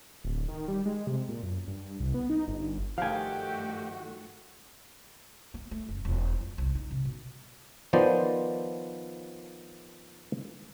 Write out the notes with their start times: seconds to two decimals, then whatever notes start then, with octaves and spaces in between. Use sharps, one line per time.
0.24 D1
0.49 D#3
0.68 G3
0.85 G#3
1.07 C3
1.29 A#2
1.43 F#2
1.67 G2
2.00 C2
2.14 B3
2.30 D#4
2.48 G1
2.98 G2 D#3 F3 A3 F#4 G4 F5 G#5
5.54 A#3
5.71 A3
5.88 F#1
6.05 E1
6.41 F2
6.58 C2
6.75 D#4
6.91 C3
7.05 B2
7.93 D#3 F3 B3 C5 D5